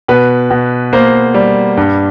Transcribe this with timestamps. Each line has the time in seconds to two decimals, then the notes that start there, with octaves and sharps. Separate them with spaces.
0.08 B2 B4
0.50 B2
0.93 A#3 C5
1.34 G3
1.77 G2